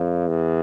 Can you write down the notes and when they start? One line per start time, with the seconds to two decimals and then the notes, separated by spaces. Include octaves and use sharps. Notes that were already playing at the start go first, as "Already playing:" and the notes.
Already playing: F2
0.28 E2